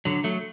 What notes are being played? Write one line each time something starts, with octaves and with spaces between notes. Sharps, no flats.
D3 F#3
F#3 A3